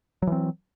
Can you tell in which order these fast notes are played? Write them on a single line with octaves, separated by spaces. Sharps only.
F#3 E3 C4